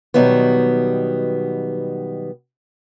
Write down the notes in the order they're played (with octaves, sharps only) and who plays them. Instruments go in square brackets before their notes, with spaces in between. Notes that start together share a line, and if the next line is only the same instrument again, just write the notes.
[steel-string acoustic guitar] B2 D#3 F#3 G3 B3